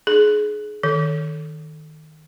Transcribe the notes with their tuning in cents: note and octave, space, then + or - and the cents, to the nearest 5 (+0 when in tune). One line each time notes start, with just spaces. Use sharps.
D#4 -45 G#4 +25
D#3 +0 A4 +0